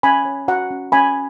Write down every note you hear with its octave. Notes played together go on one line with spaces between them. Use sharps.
C#4 G#5 B5
C#5
F#4 F#5 A#5
C#4
C#4 G#5 B5